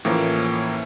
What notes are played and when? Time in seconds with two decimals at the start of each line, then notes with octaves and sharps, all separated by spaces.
0.05 A2 E3 F3 A#3 C#4